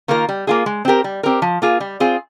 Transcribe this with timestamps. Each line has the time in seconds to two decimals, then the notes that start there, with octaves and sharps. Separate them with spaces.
0.08 D#3 A#3 F4 A#4
0.29 G3
0.47 A#3 F4 G#4
0.66 G#3
0.85 C4 G4 A#4
1.04 G3
1.23 C4 G4 A#4
1.42 F3
1.62 A#3 F4 G#4
1.80 G3
2.00 C4 F4 G#4